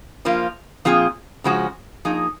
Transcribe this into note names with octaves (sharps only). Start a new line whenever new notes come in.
F3 A#3 F4
A#2 F3 C4 F4 G#4
C#3 F3 G#3 C#4 F#4
F3 A#3 D#4 G#4